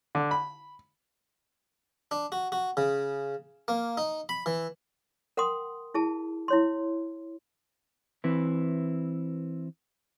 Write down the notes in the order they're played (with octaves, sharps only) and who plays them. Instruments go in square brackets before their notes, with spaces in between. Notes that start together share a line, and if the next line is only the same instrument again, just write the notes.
[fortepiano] D3
B5
[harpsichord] D4
F#4
F#4
C#3
A#3
D#4
B5
E3
[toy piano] A#4 F#5 G5 C6 D#6
E4 G#4 A5
E4 C#5 C6
[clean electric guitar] E3 C4 E4 B4